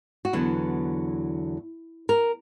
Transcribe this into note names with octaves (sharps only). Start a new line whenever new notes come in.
F#4
E2 D3 F#3 B3 E4
A#4